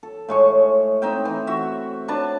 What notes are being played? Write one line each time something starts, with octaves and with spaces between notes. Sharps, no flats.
A4
A2 G#3 C#6
C4 D#4 E5 G5
E3
F#4 E5
D4 B4 A5